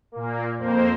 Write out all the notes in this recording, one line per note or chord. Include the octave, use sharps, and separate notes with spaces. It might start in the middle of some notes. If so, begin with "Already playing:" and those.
A#2 A#3
F2 A#3 C5